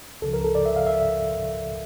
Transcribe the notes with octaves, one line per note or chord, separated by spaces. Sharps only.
C#2 C#3 F3 A4
A#4
A4
D5
E5
F5
E5